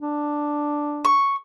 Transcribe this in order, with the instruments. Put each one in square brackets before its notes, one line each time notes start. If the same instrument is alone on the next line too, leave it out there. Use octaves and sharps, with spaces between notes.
[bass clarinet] D4
[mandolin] C#6